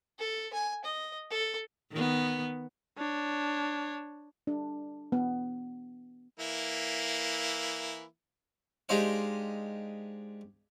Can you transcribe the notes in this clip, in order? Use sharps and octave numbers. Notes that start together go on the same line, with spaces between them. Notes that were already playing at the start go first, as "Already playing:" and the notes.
A4
G#5
D#5
A4
D#3 B3
D4 C#5
D4
B3
E3 A#3 E4
G#3 D4 D#4 G4 C5 F5